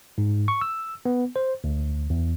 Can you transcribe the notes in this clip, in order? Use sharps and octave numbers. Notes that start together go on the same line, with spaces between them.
G#2
C#6
E6
B3
C5
D2
E2